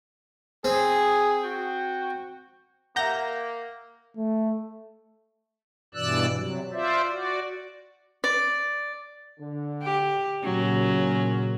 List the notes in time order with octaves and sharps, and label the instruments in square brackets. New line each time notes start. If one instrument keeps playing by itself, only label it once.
[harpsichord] C4 [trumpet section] G#4
[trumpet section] F#4 G5
[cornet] A#3 [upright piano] E5 F#5 [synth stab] A#5 G6 A#6
[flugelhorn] A3
[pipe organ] G2 B2 E3 D5 E6 F#6
C3 F#3
F4 C5 D5 E5
F#4 D5
[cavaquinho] D5
[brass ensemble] D3
[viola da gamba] G4
[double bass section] A#2 C#3 [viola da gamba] F#3 [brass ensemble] C#4